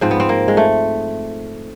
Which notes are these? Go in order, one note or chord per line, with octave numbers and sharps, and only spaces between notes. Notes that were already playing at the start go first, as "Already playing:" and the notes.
G#2 F3 C4
B3
C4
A#3
G#3
A3